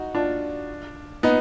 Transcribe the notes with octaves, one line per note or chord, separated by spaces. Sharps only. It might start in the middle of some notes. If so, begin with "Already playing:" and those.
Already playing: D#4 F#4
D4 F4
B3 D#4